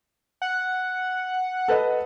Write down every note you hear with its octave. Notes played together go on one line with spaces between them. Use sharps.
F#5
A4 B4 D#5